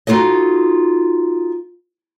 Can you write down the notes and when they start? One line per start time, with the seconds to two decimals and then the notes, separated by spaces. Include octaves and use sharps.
0.07 D#4 F4 F#4 A4 D#5